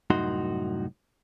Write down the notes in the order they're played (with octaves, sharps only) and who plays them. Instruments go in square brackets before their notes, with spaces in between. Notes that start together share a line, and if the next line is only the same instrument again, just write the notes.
[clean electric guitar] C2 F#2 A2 D#4 F#4 C6